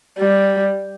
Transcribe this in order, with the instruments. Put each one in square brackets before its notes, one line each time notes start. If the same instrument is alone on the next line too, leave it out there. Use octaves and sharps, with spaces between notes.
[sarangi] G3